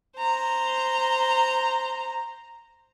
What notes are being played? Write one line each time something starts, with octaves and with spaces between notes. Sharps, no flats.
C5 A#5